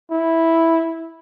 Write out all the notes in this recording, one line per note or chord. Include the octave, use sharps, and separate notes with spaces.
E4